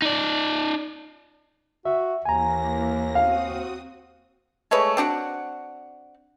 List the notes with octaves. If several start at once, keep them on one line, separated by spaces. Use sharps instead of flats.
D#4 D5
F#4 E5
D#2 E3 A#3 G#5 A#5 A#6
C4 F#4 F5 D#6
G#3 A3 B4 C#5
C4 D4 F#4 F#5